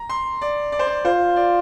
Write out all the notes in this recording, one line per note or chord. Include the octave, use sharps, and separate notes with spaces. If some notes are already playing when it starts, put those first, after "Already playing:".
Already playing: A#5
C6
D5
D5
C5
D5
F4 C5
D5